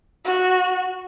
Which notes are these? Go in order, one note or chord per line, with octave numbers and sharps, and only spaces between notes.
F#4